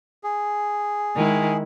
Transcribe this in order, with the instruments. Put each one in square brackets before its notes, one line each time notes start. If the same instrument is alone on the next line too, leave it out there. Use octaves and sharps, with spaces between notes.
[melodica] G#4
[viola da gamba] D#3 G#3 E4